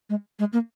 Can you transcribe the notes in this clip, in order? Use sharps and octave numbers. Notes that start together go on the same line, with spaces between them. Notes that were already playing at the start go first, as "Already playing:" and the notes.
G#3
G#3
A#3